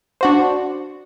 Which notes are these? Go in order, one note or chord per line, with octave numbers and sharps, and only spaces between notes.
D4 F#4 C5